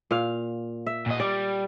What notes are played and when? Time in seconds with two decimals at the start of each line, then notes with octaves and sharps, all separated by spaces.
0.11 A#2 F5
0.86 E5
1.06 A#2 D#5
1.20 G3 D5